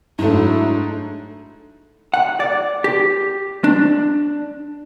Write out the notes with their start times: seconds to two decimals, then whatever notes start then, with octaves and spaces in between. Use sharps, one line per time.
0.19 G#2 F#3 A3 D4 E4
2.14 F#5
2.40 D5
2.84 G4
3.64 D4